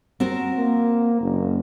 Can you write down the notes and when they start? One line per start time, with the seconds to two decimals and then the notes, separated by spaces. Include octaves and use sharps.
0.20 C4 F#4 A#4
0.59 A#3
1.21 F#1